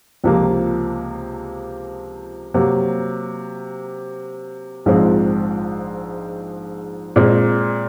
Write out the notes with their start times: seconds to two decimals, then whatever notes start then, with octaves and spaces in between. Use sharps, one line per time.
0.24 C#2 C3 F3 A#3
2.54 C3 F#3 A#3
4.86 A#1 G#2 F3 G#3 C4
7.16 A#2 G#3 C4